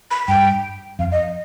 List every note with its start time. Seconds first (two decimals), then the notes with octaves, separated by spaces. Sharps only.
0.11 B5
0.28 G2 G5
0.99 F2 F5
1.12 D#5